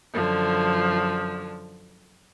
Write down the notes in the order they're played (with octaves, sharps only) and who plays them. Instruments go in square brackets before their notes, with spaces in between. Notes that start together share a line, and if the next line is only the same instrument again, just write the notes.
[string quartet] F#2 D3 F3